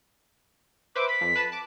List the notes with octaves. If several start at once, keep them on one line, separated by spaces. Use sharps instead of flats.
B4 C5 E5 D6
B5 B6
F2
B4 A5 B5
A5 D6